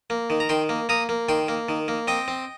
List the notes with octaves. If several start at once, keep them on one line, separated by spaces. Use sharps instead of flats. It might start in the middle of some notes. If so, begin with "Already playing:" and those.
A#3
D#3
A#5
D#3 G5 C6
A#3
A#3 A#5 D#6
A#3
D#3 G5 C6
A#3
D#3
A#3
C4 D#5 G5
C4